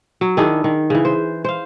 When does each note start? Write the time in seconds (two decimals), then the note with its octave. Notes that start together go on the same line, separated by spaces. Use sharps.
0.21 F#3
0.37 D#3 D4 E4 G#4
0.64 D#3
0.90 C#3 E3
1.05 C5
1.45 C5 F5